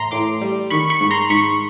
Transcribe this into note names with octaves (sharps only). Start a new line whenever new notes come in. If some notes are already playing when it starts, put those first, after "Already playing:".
Already playing: A2 E3 A#5 C6
A2 C6 D6
G3
D#3 B5 C#6
B5 C#6
G#2
A#5 C6
G#2 B5 C#6